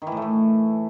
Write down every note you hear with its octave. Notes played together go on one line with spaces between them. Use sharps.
D#3
E3
A2
A3
E3